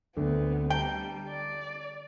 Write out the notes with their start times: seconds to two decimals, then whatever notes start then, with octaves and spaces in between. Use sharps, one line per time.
0.17 D2 B3 C4
0.70 G3 D#5 G5 A5 A#5
1.28 D5